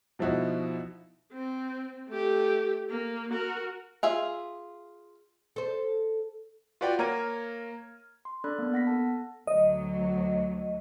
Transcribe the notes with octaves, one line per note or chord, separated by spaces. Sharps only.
B2 F3 D#4 E4 F#4
C4
A3 G4
A#3
F#4 A#4
F4 G#4 E5
A4 C5
F4 F#4 B4 D5 F#5 G5
A#3 C#5 A#5 F6 G#6 D#7
C6
D4 A4 D5 B5 F#6
A#3 B3
B3 F#5 A#6 B6
A4 A5
D2 F#3 D#5